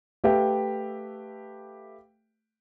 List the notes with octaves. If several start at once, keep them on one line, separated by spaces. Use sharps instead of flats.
A3 G4 B4 E5 F5 G5